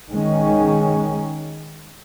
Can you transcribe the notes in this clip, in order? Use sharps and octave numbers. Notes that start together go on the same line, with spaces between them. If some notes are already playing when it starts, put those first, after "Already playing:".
D#3 G#3 C#4